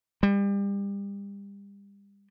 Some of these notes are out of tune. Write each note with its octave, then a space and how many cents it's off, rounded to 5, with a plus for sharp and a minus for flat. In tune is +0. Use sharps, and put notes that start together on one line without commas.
G3 +30